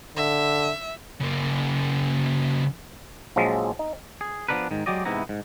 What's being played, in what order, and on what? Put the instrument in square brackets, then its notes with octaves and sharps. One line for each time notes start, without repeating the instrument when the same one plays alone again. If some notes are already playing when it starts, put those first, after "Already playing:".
[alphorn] D3 [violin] E5
[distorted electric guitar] C#3 A#3
[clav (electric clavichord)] A#1 F3 F#3 G#3
D#4
[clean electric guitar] G#4
F3 F#3 B3 D4 A#4 B4
G#2 D#3
F#3 G#3 F#4 G4 D5 D#5
G#2 C3 E3 B3 E4 A#5
G#2